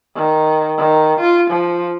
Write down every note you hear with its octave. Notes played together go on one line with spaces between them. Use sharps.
D#3
D#3
F4
F3